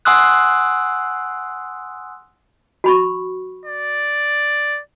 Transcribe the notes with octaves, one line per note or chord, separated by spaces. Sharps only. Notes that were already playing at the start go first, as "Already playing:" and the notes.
F#5 G#5 C6 D#6 E6 F#6
F#4 B5 C#6
D5